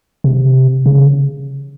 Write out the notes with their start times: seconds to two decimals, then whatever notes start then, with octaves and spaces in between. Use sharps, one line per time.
0.24 C3
0.86 C#3